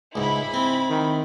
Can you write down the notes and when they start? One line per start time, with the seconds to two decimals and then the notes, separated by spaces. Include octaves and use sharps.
0.15 C#2 G#2 E4 G#4 B5
0.54 C4
0.90 D#3